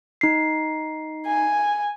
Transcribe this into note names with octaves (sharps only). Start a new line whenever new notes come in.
D#4 C7
G#5